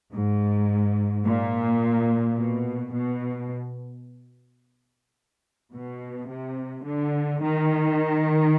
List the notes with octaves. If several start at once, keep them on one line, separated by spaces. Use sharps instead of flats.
G#2
A#2
B2
B2
B2
C3
D3
D#3